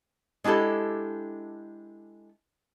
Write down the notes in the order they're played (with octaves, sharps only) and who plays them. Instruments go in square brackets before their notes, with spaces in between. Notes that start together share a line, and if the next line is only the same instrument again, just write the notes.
[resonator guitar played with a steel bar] G#3 D4 E4 G4 A4